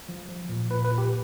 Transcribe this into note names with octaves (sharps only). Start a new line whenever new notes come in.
F3
F3
A#2
A#2 B4
B4
A#2
G4